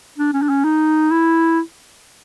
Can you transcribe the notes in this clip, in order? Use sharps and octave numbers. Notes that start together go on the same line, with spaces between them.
D4
C#4
D4
C#4
D#4
E4